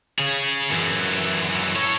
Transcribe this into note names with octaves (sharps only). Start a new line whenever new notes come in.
C#3 G#4
F#2 E3
A4 C#5